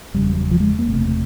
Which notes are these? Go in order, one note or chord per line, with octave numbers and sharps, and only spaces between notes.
F#1 E2 C#3 G3
F#3
F3
G#3
A#3
F#1 E2 C3 A3